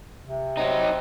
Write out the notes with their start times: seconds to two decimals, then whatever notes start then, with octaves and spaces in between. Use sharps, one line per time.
0.24 C3
0.57 F#3 C4 D#4 D#5